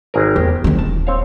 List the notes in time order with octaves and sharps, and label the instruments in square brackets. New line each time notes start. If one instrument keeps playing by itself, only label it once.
[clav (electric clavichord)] G#1 G#4 A#4
[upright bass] E2 [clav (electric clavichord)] G4
[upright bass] D#3 C#4
[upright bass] D#1 [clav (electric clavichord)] A5
[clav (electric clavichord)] C4 C#5 F5